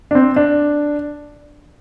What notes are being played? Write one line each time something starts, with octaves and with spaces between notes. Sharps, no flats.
D4
C4
D4